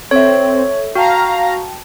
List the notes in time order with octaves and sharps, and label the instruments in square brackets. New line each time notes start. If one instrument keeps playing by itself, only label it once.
[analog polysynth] C4 [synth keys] A4 E5 [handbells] C#5
[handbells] F#4 [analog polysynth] F5 A#5 [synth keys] G5 A5